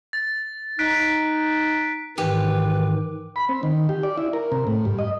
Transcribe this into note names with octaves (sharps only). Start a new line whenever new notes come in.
A6
D#4 F#6 B6 D7
G#2 D#3 E3 G4 B4
B5
C4
D#3
G4
D5
E4
A#4
C3
A2
G2
D#5